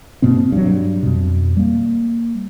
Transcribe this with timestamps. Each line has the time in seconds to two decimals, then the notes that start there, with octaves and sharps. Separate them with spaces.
0.22 G2 B2 A#3 C4
0.52 G2 F#3
1.03 F2 B2
1.57 G3 A#3